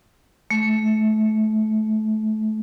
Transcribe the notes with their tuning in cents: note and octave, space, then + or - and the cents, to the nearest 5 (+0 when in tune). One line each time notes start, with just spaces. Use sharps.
A3 -25